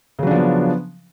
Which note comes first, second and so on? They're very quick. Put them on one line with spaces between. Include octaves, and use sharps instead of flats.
C#3 F#3 D4 F3 B3